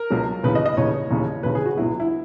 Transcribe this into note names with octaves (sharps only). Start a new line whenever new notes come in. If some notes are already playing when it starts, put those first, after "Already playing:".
Already playing: A#4
C#2 B2 F#3
D#2 C#3 E3 B4
D#5
D#5
D#2 C#3 E3 C#5
D#2 C#3 E3
D#2 C#3 E3 B4
G#4
F#4
C#2 B2 F#3 E4
E4